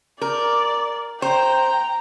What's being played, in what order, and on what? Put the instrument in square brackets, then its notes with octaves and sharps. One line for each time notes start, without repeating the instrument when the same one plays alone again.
[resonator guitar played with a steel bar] A#4 [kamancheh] D5
[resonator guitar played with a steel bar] C5 [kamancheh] G5 [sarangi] A#5